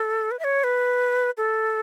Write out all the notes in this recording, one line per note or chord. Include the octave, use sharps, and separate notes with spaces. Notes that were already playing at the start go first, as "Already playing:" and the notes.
Already playing: A4
B4
E5
C#5
B4
A4